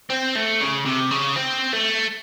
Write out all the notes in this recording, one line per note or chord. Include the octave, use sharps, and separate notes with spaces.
C4
A3
C#3
C3
C#3
C4
A3